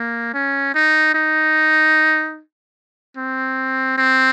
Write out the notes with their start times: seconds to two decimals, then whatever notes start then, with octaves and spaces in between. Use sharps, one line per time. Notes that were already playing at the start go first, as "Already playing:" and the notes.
Already playing: A#3
0.34 C#4
0.74 D#4
1.14 D#4
3.17 C4
3.98 C4